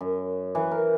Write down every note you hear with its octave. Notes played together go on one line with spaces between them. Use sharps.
F#2
E3
A#4